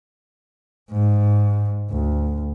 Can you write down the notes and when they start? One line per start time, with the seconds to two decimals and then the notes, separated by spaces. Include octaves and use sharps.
0.91 G#2
1.91 D2